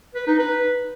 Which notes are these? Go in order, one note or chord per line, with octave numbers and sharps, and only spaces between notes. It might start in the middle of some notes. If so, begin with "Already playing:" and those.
B4
D#4
B4